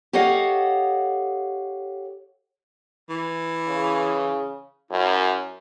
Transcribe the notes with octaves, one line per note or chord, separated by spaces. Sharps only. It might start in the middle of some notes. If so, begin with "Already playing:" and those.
G4 A4 C#5 D#5 F5 F#5
E3
C#3
F#2 E4